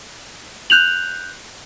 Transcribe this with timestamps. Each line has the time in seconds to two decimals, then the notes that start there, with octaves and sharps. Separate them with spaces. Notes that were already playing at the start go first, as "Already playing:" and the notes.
0.70 F#6 G6 F7 F#7